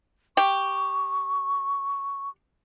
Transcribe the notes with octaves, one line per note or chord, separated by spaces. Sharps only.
G4 C#6